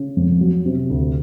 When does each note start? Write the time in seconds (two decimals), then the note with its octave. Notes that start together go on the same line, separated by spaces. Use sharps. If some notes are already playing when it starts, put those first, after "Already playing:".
Already playing: C#3
0.17 F2
0.41 F#3
0.66 C3
0.90 D2